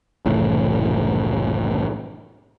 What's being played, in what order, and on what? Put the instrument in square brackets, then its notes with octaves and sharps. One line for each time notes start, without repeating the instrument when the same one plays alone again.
[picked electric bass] F#1 C2 A2 E3